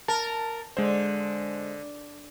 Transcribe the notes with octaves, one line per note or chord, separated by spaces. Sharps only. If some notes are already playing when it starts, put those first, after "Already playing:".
A#4 A5
D3 G#3 C5